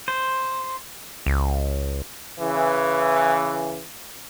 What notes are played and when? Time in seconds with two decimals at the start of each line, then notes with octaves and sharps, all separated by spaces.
0.08 C5
1.26 C#2
2.40 C#3 E3